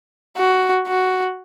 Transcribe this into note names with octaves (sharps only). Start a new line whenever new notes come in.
F#4
F#4